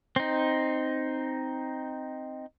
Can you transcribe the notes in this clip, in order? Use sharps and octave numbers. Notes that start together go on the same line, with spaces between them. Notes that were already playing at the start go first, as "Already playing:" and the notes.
C4 D#4